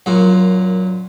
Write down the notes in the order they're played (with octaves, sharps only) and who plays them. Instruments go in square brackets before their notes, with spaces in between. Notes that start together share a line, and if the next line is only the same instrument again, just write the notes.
[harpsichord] F#2 A#2